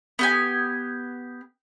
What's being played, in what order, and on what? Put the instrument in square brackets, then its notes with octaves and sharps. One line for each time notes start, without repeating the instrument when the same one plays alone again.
[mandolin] B3 G4 G#5